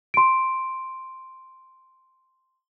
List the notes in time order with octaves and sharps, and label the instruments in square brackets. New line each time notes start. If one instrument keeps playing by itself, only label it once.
[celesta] C6 D7